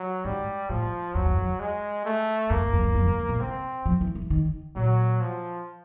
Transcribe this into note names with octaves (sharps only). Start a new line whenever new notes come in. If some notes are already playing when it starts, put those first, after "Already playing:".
Already playing: F#3
G#2 G3
A2 F3
F2 F#3
E2
F2
G#3
A3
G2 A#3
G2
F2
E2
F2
G2
B2
C3 C4
F3
E3
E3
D#3
A#2 F#3
F3